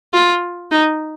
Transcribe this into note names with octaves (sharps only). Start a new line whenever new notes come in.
F4
D#4